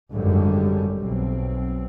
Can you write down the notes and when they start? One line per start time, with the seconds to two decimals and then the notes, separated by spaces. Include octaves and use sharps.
0.12 G#1 F#2 D3 G3
0.98 B1 C4